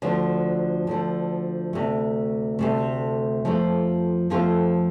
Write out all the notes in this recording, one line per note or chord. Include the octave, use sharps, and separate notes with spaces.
D2 D3 F3
D2 D3 F3
D2 C3 A3
D2 C3 A3
F2 F3 A3 C4 F4
F2 F3 A3 C4 F4